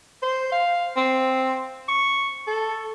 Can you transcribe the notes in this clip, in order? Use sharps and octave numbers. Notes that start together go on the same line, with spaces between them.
C5
F5
C4
C#6
A4